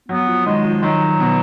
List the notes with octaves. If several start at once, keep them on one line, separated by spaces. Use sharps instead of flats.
F#3 B3
F3
D#3 G#3
F3
D#3 F#3
B2